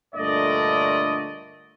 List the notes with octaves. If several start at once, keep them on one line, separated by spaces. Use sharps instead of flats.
G2 A#2 D3 A3 D5 D#5